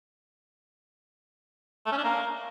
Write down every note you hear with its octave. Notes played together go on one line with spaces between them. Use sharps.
A3
C#4
D4
A#3